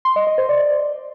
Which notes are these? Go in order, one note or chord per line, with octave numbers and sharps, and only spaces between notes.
C6
D#5
D#5
C5
D5